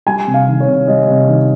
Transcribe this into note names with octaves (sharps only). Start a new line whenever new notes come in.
G3 G#5
C3
F5
D#3
C#5
C3
G3 D#5
C3
D#3